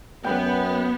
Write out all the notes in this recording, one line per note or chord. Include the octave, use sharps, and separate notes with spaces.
F#2 B3 B4 G5